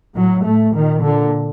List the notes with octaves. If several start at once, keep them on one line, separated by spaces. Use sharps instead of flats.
A2 F#3
A2 A3
A#2 D#3
A#2 D3